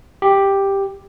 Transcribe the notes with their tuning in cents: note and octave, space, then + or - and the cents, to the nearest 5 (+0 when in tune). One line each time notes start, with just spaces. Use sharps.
G4 +5